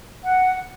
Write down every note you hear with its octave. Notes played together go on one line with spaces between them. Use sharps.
F#5